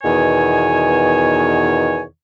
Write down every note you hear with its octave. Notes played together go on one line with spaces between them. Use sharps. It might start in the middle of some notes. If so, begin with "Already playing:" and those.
E2 B2 D#3 C#5 G#5